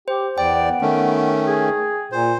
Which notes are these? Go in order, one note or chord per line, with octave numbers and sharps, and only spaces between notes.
G4 C5
E2 B3 D5 G5
D#3 A3 C#4
G#4
A#2 C5